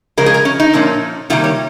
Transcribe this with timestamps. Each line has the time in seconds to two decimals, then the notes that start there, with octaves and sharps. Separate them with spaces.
0.17 C#3 F3 G#3 A#4
0.26 G#4
0.34 A#4
0.45 C#4
0.60 D#4
0.73 A#2 F3 A#3 C#4
1.30 C3 D#3 G3 A#3 F4
1.44 C#5